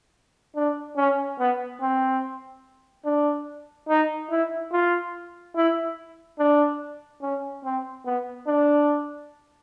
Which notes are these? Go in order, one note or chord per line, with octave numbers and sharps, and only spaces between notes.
D4
C#4
B3
C4
D4
D#4
E4
F4
E4
D4
C#4
C4
B3
D4